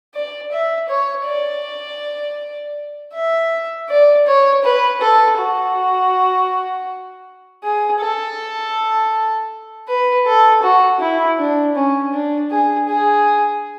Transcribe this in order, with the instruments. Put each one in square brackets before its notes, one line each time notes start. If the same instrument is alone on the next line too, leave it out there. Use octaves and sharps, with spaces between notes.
[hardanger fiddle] D5
E5
C#5
D5
E5
D5
C#5
B4
A4
F#4
G#4
A4
B4
A4
F#4
E4
D4
C#4
D4
G#4
G#4